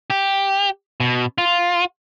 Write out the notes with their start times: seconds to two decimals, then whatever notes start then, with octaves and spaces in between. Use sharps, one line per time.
0.10 G4
1.00 B2
1.38 F4